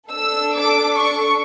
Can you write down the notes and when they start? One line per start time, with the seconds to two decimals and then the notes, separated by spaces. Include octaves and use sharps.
0.10 D4 A4 E6
0.56 D6
1.00 C#6